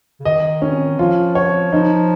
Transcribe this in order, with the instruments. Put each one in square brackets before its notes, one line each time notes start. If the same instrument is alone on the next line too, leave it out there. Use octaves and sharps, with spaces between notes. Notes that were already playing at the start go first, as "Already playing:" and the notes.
[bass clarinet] C#3
[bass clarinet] D#3 [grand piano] D#5
[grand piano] C#4
[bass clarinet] F3 [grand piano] F4
[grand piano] C#5
[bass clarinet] F3 [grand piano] D#4